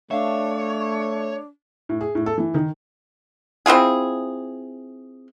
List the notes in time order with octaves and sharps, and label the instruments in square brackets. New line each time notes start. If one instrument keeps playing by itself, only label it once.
[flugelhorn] A3 [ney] D4 [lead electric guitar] C#5 [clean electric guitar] E5 F5
[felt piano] A2
G#4
A2
A4
E3
D#3
[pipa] C4 E4 F4 G#4